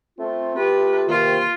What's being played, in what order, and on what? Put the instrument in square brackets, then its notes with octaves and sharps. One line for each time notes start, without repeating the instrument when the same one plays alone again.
[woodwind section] A3 F4 [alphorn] C4
[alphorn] G4 [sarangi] B4
[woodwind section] C3 D#3 [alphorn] A#3 [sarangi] F4